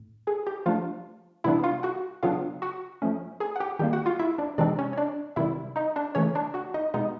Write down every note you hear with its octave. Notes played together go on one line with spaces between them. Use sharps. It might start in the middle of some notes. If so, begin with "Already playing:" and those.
Already playing: A2
G#4 G#5
G4 G5
F3 A3 D4 F4 F5
C3 E3 G3 B3 D4 E4 E5
F4 F5
F#4 F#5
C#3 F#3 B3 D4 F4 F5
F#4 F#5
F3 A3 C#4
G#4 G#5
F#5
G4 G5
D#3 G3 A#3 G4 G5
F#4 F#5
F4 F5
E4 E5
D4 D5
C3 E3 G#3 C4 D4 D#4 D5
C#4 C#5
C#5
D4 D5
C3 D#3 G3 E4 E5
D#4 D#5
D4 D5
C#3 E3 A3 C#4 C#5
D4 D5
F#4 F#5
D#4 D#5
B2 G#3 B3 D#4 D#5